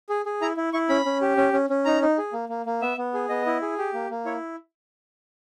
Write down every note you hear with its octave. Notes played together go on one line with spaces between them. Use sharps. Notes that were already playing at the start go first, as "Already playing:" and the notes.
G#4
G#4
E4 A#5
E4
E4 C#6
C#4 B5
C#4
G4
C#4
C#4
C#4
D#4 A#5
D#4
G#4
A#3
A#3
A#3
B3 E5
B3
G#4
B3 D#5
E4
G#4
G4
A#3
A#3
E4 C#5